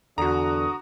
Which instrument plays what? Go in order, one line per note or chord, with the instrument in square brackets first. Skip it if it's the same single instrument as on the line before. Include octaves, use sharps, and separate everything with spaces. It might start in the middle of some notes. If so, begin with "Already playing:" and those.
[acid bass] E2 [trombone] D3 [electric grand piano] F#4 A#5 [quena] D#6